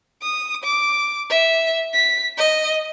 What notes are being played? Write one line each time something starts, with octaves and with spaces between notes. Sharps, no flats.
D#6
D6
E5
B6
D#5